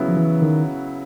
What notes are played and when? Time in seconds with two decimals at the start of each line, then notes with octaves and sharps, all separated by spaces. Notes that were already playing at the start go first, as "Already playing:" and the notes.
Already playing: C#3 F#3 B3 E4
0.08 F3
0.17 E3
0.42 D#3